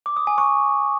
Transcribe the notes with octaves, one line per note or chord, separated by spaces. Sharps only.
D6
D#6
G#5
C#6